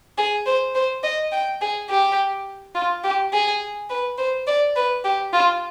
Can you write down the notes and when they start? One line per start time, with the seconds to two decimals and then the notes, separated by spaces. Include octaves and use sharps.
0.18 G#4
0.46 C5
0.75 C5
1.04 D#5
1.32 G5
1.61 G#4
1.90 G4
2.75 F4
3.04 G4
3.33 G#4
3.90 B4
4.18 C5
4.47 D5
4.76 B4
5.04 G4
5.33 F4